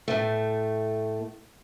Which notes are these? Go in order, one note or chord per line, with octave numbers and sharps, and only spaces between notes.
A2 A3